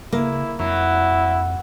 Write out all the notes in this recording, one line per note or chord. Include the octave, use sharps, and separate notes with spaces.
C#3 A#3 E4
F2 F#3 E4